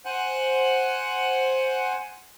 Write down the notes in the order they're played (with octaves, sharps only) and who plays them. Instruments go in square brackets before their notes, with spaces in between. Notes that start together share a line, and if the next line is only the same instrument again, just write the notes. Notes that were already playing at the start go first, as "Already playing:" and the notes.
[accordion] C5 F#5 G#5 F#6